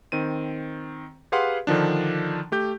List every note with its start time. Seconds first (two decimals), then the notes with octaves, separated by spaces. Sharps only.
0.12 D#3 C4 D#7
1.32 G4 G#4 B4 F5 F#5 C6
1.67 D3 D#3 F3 D4
2.52 A3 G4 G6